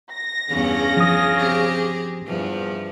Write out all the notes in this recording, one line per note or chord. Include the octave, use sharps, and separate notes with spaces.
A#6
E2 G2 C#3 C#4
F3 D#6
C4 G4 G#4
E2 G2 F3